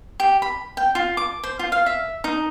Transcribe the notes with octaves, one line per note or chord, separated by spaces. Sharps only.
G4
B5
G5
F4
D6
C5
F4
F5
E5
D#4